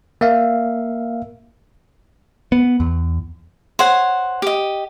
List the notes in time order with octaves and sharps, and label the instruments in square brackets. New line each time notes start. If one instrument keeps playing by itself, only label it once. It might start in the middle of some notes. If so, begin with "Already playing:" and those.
[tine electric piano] A#3 E5 F5
[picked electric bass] B3
E2
[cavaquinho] C5 C#5 F#5
G4 D#5